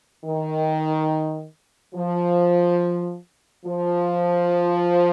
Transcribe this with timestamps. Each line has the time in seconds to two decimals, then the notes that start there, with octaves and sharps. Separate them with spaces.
0.25 D#3
1.95 F3
3.66 F3